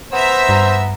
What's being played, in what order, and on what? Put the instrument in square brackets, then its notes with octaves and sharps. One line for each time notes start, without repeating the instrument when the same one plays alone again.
[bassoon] B3 [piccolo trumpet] C5 [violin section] E5 A#5 E6
[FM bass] G2